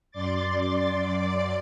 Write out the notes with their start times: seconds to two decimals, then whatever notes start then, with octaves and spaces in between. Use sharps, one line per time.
0.11 F#2 D5 C6 D6 A6